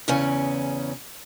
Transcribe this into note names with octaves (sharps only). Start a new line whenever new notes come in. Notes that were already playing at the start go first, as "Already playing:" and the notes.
E2 C#3 C#4